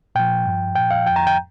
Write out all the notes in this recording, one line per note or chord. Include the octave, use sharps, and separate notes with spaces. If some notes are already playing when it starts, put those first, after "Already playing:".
A#2 F3 G5
G2 F3
A#2 F3 G5
F5
F2 F3 G5
A#5
G5